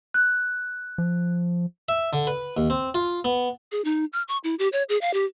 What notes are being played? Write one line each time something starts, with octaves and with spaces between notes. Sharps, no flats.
F#6
F3
E5
D3
B4
D#2
C4
F4
B3
G#4
D#4
F6
C#6
E4
G4
C#5
G#4
F5
G4